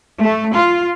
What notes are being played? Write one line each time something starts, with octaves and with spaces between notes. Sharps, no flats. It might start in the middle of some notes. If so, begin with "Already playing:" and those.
A3
F4